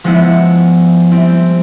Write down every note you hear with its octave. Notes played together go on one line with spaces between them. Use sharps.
F3 G#3 B3 E4
G3 C4 E4